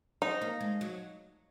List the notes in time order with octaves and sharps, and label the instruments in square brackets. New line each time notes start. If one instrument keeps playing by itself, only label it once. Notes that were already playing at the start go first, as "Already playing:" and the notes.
[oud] C4 [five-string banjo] D#4
[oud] A#3
G#3
F#3